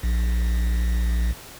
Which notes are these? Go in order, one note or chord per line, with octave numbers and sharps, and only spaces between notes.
A#1